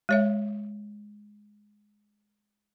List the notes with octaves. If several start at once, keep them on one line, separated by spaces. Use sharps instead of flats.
G#3 C#5 E5